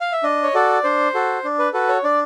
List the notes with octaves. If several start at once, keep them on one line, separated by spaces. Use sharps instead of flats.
F5
E5
D4 D#5
C#5
F#4 A4 D5
D4 C5
F#4 A4
D4
B4
F#4 A4 B4
C#5
D4 D5